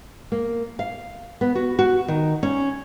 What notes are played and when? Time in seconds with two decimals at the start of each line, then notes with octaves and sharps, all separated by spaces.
0.32 A#3
0.79 F5
1.41 B3
1.55 F#4
1.79 F#4
2.08 D#3
2.43 C#4